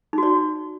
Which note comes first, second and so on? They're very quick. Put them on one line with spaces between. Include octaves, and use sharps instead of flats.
D#4 F#4 D5